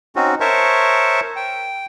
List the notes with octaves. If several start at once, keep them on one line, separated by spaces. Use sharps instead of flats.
C4 C#4 D#4 F#4
A#4 C5 C#5 E5 A5 C#6
G5